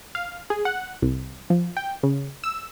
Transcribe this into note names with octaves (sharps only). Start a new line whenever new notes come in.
F5
G#4
F#5
C2
F3
G5
C#3
E6